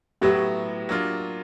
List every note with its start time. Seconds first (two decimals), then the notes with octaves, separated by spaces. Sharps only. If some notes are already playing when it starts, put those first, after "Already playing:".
0.21 A2 F#3 B3 E4 G4
0.89 F#3 A#3 D4 F4